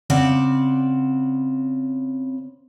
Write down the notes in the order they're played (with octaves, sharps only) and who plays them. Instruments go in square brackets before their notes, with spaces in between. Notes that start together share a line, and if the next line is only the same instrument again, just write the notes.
[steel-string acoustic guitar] C#3 C4 D5 F#5